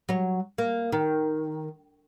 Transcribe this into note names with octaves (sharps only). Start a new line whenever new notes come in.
F#3 C#5
A#3
D#3